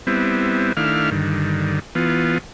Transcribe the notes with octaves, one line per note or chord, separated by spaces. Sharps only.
G3 B3 C4 E4
D#3 A3 D4 E4 F5 F6
G2 D3 D#3
E3 B3 F4